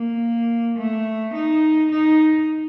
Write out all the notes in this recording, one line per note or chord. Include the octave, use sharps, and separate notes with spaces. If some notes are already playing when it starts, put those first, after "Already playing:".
Already playing: A#3
A3
D#4
D#4